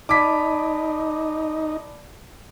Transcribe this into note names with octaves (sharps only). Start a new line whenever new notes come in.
D#4 D5 A5 B5 D6 B6